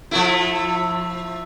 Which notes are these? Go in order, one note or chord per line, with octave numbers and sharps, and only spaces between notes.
F3 A3 E4